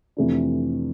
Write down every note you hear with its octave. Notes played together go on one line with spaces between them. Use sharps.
F2 C3 E3 A3 D4